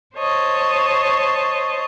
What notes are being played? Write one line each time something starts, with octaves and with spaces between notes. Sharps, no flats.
C5 C#5 D#5 A5